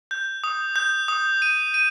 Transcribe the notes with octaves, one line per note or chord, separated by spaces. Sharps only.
G6
D#6
G6
D#6
D#7
D#7